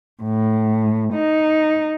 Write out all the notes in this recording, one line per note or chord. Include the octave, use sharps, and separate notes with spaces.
A2
D#4